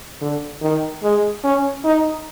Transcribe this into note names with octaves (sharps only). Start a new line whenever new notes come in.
D3
D#3
G#3
C#4
D#4